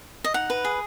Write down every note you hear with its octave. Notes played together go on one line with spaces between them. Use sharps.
D#5
D#4 F#5
B4
G#4